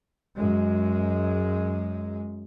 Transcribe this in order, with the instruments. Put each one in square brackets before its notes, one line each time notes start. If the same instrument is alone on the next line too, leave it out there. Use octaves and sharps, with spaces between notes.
[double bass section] F#2 G#3